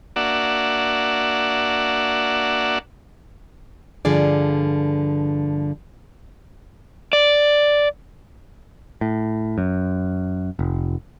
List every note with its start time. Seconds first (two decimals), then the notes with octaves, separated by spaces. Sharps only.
0.16 A#3 D4 F#4 D5 E5 F#5
4.05 G2 D3 F3 G#4 D5
7.13 D5
9.01 A2
9.58 F#2
10.59 F1